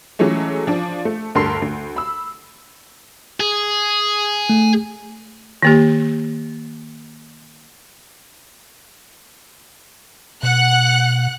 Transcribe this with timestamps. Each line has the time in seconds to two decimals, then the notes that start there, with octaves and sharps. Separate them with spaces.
0.19 E3 F#3 G#3 A3 C#4
0.67 F3 D4
1.05 A3
1.35 D2 G2 A4 A#4 C6 C7
1.62 D2
1.96 B5 E6
3.40 G#4
4.49 A3
5.63 D#3 A#3 G4
10.43 B2 F#5 F#6